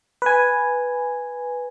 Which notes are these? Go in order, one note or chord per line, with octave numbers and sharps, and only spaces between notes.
B4 G#5